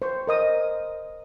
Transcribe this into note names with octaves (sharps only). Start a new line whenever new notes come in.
C5 C#6
A#4 D#5 D#6